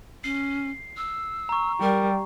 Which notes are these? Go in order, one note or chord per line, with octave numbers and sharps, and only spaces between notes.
C#4 C7
E6
A#5 C#6
G3 A#4